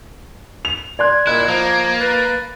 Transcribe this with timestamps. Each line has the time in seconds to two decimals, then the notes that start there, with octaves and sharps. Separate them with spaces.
0.65 F7
0.99 D5 C6 F#6 G#6
1.27 A#2 E4 D#5 F#6
1.48 F3 A#3 G#6
2.00 B4 A6